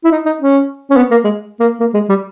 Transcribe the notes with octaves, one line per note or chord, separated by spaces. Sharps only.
E4
D#4
D#4
C#4
C#4
B3
A#3
G#3
A#3
A#3
G#3
G3